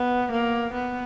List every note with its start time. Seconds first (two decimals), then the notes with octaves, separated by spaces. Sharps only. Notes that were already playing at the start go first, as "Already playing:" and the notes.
Already playing: B3
0.32 A#3
0.74 B3